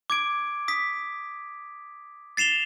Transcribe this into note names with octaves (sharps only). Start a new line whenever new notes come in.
D6 G#6 D7
D#6 B6
A6 C7 E7 F7 G7